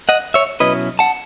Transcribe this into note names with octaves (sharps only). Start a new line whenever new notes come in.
D#5 F#5
C#5 E5
B2 F#3 C#4 E4 B4 D#5
F#5 A5